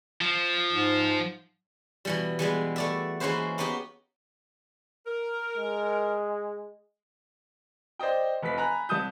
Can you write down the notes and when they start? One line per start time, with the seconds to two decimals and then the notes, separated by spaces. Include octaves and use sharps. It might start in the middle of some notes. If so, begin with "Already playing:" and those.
0.21 F3
0.70 G#2
2.05 B2 E3 G3
2.39 E3 G3 G#3 B3
2.76 A3 D5 E5
3.20 E3 G#3 A#3 C#4 B4 C5
3.58 A#3 B3 D#4 F#4 G4
5.07 A#4
5.57 G#3
7.99 C5 D5 D#5 G5
8.43 F1 B4 D#5 B6
8.58 G#5 A#5 B5 F#6
8.89 C2 A5 D#6 G6